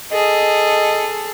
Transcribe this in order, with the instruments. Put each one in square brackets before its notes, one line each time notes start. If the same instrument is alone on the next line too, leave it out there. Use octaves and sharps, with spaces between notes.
[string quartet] G#4 A4 [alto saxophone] D#5